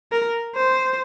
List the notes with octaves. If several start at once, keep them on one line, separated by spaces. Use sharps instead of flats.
A#4
C5